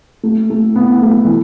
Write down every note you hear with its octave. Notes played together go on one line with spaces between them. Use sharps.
A3
A3
B3
A3
E3